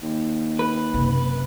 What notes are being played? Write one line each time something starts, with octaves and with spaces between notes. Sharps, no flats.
D#2
B4
F#1 C3